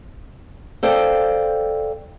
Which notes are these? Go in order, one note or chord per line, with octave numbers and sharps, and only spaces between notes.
A4 C5 D5 F5 G5